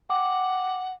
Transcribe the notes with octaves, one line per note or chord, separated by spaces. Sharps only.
F#5 G5 D6